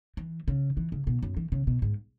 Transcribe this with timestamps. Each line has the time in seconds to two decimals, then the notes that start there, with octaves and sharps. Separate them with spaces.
0.17 E3
0.48 C#3
0.77 E3
0.92 C#3
1.07 B2
1.22 F#2
1.37 E3
1.52 C#3
1.67 B2
1.82 G#2